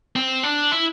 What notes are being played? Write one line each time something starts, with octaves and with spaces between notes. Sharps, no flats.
C4
D4
E4